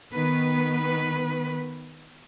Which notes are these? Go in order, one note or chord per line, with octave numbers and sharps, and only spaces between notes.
D#3 B3 B4